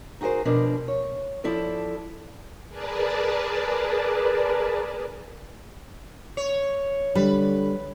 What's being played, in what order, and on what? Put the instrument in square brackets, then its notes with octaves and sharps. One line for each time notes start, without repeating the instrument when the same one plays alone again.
[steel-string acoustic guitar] D#4 F#4 G#4 A#4 C5
B2 F3 D4 A#4
C#5
F3 E4 A4 D5
[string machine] G#4 A#4 B4 D5 A5
[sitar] C#5
[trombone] D3 [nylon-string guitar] G3 [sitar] B4